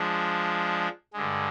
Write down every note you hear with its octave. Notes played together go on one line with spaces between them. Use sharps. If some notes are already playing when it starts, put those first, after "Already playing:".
Already playing: F3 G#3 D4
G2 D3 G#3